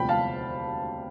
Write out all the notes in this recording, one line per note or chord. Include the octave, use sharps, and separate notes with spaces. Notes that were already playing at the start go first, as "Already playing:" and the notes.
Already playing: E1 D2 C3 F3 G5 B5
F5 A5